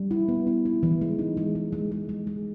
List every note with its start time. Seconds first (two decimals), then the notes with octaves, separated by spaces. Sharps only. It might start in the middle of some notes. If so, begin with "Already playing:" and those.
Already playing: G3
0.11 E4
0.29 B3
0.47 E4
0.65 E4
0.83 E3
1.01 G#3
1.19 D#4
1.37 G#3
1.55 G#3
1.73 G#3
1.92 G#3
2.09 G#3
2.27 G#3